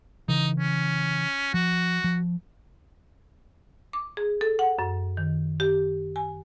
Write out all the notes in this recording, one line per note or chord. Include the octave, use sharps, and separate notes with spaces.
C#3 E3 D#4
C#4
F3 F#4
F3
D6
G#4
A4
F#5
F#2
D#3
G4
G#5